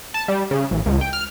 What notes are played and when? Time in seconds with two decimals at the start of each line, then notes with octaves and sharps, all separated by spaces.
0.14 A5
0.28 G3
0.51 C#3
0.71 A1
0.86 C#2
1.01 G5
1.13 F6